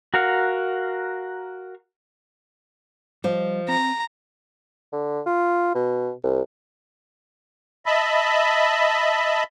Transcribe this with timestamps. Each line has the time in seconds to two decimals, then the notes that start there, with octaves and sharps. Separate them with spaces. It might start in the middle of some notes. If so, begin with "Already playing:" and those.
0.14 F#4 A#4 F5 F#5
3.24 F3 G3 D#5
3.68 C4 A#5
4.92 D3
5.26 F4
5.75 B2
6.24 C2
7.86 D#5 E5 A5 B5